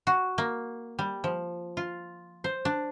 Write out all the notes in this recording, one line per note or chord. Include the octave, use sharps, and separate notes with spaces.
F#4
A#3
G3
F3
F4
C5
D4